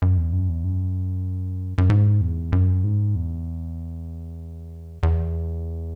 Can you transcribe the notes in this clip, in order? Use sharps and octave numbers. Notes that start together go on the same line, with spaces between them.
F#2
E2
F#2
E2
F#2
F#2
G#2
E2
F#2
G#2
E2
E2